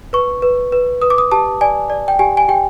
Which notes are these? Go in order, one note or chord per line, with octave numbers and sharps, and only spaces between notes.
B4 C#6
B4
B4
B4 D#6
D6
D#6
G4 A5
D5 G#5
D5
G5
G4 G#5
G#5
G4 G5